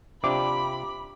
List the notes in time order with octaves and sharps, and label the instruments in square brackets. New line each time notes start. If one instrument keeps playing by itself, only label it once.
[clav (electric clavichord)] C3 [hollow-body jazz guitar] D4 F4 G4 [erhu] B5 [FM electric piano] D6